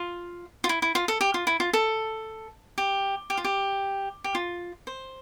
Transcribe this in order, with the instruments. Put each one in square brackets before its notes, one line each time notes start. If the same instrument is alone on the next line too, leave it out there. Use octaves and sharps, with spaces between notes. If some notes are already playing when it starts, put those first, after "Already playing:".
Already playing: [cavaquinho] F4
F4
E4
E4
F4
A4
G4
F4
E4
F4
A4
G4
G4
F4
G4
G4
F4
C5